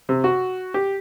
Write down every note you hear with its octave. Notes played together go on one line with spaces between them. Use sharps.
C3
F#4
G4